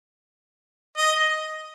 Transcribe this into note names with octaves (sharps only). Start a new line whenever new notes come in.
D#5